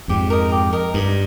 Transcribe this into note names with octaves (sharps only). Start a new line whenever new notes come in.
F2 G#2 G4
A#4 D#5
G4
A#4 D#5
G2 D#4